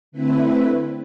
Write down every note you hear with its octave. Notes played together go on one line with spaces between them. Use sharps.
D3 A3 C4 E4 B4